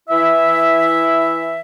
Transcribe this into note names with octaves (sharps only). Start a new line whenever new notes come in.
E3 E4 E5